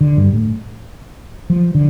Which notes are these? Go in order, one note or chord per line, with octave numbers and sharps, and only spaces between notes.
D3
G2
A2
F3
D3